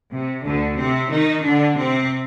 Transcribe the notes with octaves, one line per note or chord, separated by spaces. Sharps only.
C3
D2 D3
C3 C4
D#3 D#4
D3 D4
C3 C4